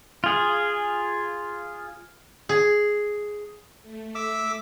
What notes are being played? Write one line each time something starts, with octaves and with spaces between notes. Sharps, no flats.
F4 G#4
G#4
A3
E5 D6 E6